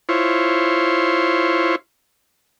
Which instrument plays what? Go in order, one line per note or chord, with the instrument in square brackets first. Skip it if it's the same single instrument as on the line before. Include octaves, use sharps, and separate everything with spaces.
[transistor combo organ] E4 F4 C5 C#5